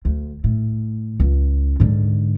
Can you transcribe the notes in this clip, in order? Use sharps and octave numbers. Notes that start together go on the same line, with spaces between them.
D2
A2
C#2
G#2 D3